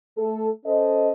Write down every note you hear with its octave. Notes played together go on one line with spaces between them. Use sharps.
A3 A4
C#4 A4 C5 D#5